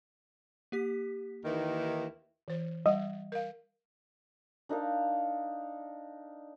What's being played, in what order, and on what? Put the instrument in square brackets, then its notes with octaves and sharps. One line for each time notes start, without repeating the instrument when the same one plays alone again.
[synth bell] A#3 G4 B6
[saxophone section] D#2 D#3 E3
[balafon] E3 C5
[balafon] G3 F#5 [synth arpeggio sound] D#5
[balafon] A#4 F5
[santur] D4 D#4 A#4 F5